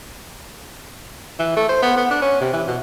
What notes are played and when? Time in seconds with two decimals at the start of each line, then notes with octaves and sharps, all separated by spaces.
1.39 E3
1.57 A3
1.69 C5
1.82 B3
1.97 B3
2.10 D4
2.22 C#4
2.41 C3
2.53 E3
2.68 B2